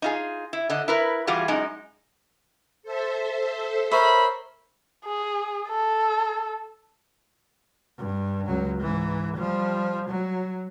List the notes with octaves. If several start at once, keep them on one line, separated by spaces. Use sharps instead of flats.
D#4 F4 G#4
E4
D3 D#5
E4 A#4 B4
E3 G3 F4 F#4 G#4
F#2 G#3 D#4
A4 C5 E5
A#4 C5 C#5 E5 B5
G#4
A4
G2
C#2 F#3
G#2 E3
F3 G3
F#3